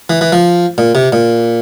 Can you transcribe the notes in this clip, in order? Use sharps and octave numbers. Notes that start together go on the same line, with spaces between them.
E3
E3
F3
A#2
C3
A#2